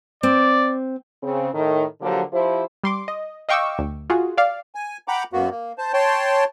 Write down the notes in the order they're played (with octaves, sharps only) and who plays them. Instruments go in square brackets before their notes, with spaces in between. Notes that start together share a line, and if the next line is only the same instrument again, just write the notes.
[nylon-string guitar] C4 [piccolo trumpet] D5
[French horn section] C#3 C4
A2 D#3
D3 F3 F#3 A#3 G4
F3 E4 G4 C5
[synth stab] G3 C6 D6
D#5
D#5 F5 G5 C#6 D6 E6
D2
F4 F#4 G#4
D5 F5
[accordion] G#5
F#5 G5 A#5 B5 D6
F#2 A#3 B3 F#4
A#3
C5 A5
C#5 G5 A5 C6